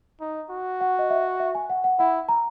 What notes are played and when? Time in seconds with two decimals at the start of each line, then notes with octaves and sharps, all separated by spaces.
0.21 D#4
0.50 F#4
0.81 F#5
0.99 D#5
1.10 E5
1.40 E5
1.55 G#5
1.70 F#5
1.84 F#5
1.99 E4 F#5
2.29 A#5